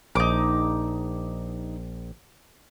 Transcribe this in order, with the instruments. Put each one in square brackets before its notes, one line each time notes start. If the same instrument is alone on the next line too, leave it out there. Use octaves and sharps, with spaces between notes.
[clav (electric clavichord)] A#1 [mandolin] D#4 D6